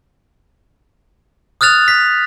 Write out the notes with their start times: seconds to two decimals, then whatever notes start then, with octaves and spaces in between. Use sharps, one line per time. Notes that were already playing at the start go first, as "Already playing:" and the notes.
1.61 D#6 F6 F#6 A6 F7
1.88 B6